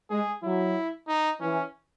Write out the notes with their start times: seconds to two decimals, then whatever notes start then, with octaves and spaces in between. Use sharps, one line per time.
0.10 G#3 G#4
0.43 F#3 E4
1.08 D#4
1.40 E3 C#4